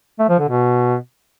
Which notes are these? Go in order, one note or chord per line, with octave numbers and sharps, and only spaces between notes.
A3
F3
D3
B2